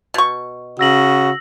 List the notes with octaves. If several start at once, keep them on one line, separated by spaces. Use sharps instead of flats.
B2 C#6
C#3 F#4 E6 A#6 F#7